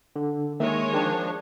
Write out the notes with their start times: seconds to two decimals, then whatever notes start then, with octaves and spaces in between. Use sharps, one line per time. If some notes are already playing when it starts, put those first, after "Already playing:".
0.16 D3
0.60 D#3 G#3 A#3 D#4 C#5 E5
0.93 F3 D4 G#4 A#4 G5